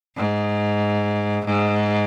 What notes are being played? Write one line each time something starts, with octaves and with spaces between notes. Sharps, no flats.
G#2
G#2